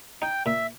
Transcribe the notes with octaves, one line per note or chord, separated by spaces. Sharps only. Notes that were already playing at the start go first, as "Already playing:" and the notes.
D#4 G5
A#2 E5